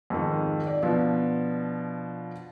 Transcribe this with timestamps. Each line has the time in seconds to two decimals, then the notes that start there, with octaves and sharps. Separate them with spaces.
0.10 F2 G#2 D#3
0.67 D5
0.83 B2 F3 D4